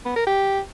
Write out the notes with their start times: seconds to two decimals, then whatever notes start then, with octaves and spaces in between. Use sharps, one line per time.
0.05 B3
0.16 A#4
0.27 G4